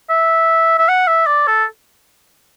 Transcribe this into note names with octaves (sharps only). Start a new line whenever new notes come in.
E5
E5
F#5
E5
D5
A4